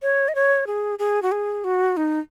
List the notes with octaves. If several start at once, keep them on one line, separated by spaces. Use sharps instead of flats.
C#5
D#5
C#5
G#4
G#4
F#4
G#4
F#4
D#4